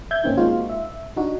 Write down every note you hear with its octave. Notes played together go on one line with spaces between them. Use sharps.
E5 G6 G#6
G#2 D#3 A#3 C4 C#4 D#4
G#3 A#3 C4 D#4 F4 F#4
E5
D4 D#4 F#4